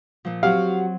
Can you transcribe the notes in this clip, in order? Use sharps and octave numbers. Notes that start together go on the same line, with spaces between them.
A#2 F3
F#3 C4 F#4 G4 F5